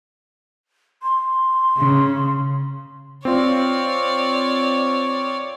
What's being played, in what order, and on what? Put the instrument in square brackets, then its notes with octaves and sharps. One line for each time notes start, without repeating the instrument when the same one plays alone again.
[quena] C6
[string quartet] C#3
[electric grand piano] C4 F4 [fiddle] C#5 D5